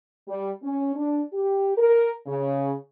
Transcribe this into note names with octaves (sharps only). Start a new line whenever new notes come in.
G3
C#4
D4
G4
A#4
C#3